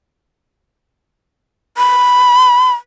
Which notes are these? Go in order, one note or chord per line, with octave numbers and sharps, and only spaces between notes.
B5